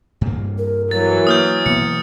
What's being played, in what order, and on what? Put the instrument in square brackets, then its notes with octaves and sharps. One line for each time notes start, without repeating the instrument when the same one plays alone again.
[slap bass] G2 A#3
[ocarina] A#4
[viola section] E3 F#3 [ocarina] A#4 [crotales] A6
[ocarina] A#3 [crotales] D#6 F6 G6
[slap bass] B2 E3 B3 [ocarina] A#3 [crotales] C#7